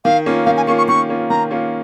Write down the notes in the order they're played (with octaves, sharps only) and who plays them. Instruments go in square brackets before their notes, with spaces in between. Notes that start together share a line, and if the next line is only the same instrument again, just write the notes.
[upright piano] D#3 [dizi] F5
[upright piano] A#3 C#4 F4
[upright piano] D#3 [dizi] F5
[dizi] G#5
[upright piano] A#3 C#4 F4 [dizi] C#6
[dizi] C#6
[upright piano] D#3 [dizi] C#6
[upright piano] A#3 C#4 F4
[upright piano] D#3 [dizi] A#5
[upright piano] A#3 C#4 F4